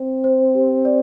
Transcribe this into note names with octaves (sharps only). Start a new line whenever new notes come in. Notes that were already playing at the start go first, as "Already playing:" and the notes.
Already playing: C4
C5
G4
D5